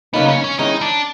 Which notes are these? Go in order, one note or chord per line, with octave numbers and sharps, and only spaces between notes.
C#3 F#3 A#3 B3 D#4
C#4
C#4
D#3 G#3 C#4 D#4 E4
D4